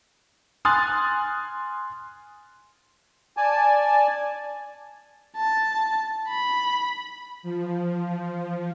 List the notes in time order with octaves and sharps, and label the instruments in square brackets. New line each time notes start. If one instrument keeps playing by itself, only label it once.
[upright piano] G#5 C6 D#6 F6 F#6 A6
[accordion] D5 G#5 A5
[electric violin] A5
B5
[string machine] F3